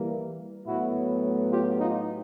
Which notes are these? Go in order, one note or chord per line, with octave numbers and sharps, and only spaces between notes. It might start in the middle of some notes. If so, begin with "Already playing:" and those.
Already playing: E3 G3 A#3
A2 F#3 B3 E4 F#4
F4 G4
D#4 F4